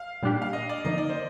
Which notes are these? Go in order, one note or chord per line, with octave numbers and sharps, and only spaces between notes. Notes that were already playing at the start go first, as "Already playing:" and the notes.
Already playing: F5
A#2 G3 D4 G4
F5
D#5
D5
D3 F3 A#3 D#4 D#5
D5
C5